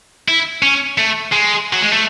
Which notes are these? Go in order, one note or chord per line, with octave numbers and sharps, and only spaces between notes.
E4
C#4
A3
G#3
F#3
G#3
A3